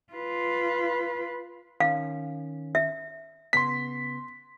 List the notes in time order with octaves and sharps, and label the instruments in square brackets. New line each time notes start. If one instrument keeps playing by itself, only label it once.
[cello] F4 B4
[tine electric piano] D#3 C#4 [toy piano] F5
[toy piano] E5
[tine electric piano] C#3 B3 [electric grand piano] C6 B6